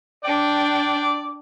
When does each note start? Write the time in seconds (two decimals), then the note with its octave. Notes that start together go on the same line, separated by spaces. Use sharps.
0.25 D4 D5 G5